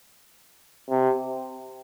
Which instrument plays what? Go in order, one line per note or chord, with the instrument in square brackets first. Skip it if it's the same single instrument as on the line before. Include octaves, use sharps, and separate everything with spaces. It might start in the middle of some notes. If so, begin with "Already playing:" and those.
[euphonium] C3